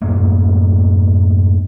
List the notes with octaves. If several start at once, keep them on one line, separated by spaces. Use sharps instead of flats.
F#2 A2 G#3 A#3